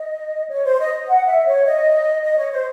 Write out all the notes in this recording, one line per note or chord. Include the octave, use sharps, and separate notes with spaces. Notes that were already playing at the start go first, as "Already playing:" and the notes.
Already playing: D#5
C#5
C5
D#5
F#5
E5
C#5
D#5
D#5
C#5
C5